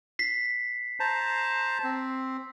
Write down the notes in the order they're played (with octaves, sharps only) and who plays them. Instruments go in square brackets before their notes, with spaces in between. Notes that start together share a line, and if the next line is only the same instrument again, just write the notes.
[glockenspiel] B6 C7
[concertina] C5 A5 A#5
C4